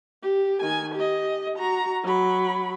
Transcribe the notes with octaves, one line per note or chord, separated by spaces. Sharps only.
G4
D#3 G#5
G4 D#5
F#4 A#5
F#3 B5